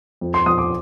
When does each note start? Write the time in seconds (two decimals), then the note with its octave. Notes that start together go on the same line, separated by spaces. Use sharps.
0.21 F2
0.34 C6
0.46 F2 D#6
0.58 D6